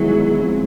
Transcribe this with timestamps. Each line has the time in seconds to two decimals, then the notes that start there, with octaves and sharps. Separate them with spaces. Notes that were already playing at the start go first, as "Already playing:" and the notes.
Already playing: D#3 F#3 G#3 B3 E4 G#4
0.40 F3 G#3 C4